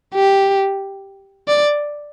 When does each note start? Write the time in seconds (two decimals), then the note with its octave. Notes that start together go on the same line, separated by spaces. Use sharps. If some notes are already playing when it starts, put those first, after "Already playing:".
0.15 G4
1.48 D5